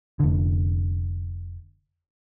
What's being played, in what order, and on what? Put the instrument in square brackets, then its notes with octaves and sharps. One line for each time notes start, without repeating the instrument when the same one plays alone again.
[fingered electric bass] F1 D3